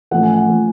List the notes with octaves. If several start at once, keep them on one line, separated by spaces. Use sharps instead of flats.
A1 A2 F3 A3 F#5
G#5
F#5
A2 F3 A3